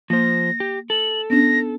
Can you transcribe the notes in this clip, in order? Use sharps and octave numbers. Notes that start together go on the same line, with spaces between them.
F3 A#3 C5 A#6
G4
A4 F#7
B3 C#4 D4 A#6